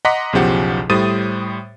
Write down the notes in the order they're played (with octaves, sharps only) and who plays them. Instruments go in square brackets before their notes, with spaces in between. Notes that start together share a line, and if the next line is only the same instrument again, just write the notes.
[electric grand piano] D#5 F#5 A#5 C6 D6 B6
B1 E2 C#3 F3 G4 F#5
A2 G3 C5 D#6 A6 D#7